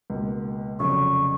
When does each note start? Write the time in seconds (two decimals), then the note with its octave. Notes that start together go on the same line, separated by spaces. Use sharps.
0.10 C#2 B2 A#3
0.79 F1 F2 C#3 F#3 C#6